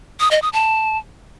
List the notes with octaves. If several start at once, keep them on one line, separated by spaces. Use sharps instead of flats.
D#6
D#5
D#6
A5